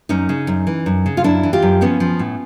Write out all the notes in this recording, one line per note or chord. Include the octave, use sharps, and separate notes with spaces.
F#2 C#4 D#4
C#3
F#2
E3
F#2
C#3
F4
F#2 D4 E4
E3
F4 G4
F#2
F3 B3 C#4
F3
A2